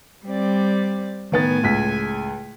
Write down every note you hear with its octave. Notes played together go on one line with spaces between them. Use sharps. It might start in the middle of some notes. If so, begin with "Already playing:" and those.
G3 C4 D5
A2 D#3 B3 G#5 A6
C#2 B6